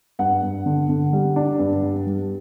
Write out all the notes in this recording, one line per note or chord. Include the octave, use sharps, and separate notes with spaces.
G2 F#5
G2
D3
D3
G3
D4
G2
G3
G3